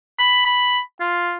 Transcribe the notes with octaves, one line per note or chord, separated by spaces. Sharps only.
B5
B5
F4